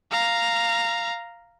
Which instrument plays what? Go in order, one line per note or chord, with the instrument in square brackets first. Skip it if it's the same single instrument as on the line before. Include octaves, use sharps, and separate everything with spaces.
[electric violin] F5 A#5